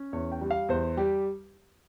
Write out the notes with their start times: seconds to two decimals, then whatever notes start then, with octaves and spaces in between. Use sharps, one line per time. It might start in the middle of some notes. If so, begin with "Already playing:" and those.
Already playing: C#4
0.13 E2 C#5
0.32 G5
0.41 G3
0.51 F5
0.69 E2 C5
0.97 G3 G4